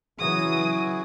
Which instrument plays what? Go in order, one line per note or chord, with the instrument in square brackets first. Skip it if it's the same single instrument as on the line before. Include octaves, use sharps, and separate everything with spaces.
[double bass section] C#3 E3 F#3 [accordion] E4 F#4 G#4 [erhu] D#6